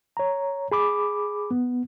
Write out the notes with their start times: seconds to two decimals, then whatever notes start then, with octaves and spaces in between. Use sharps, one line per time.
0.17 C#5 A#5
0.72 G#4 B5 D6
1.51 B3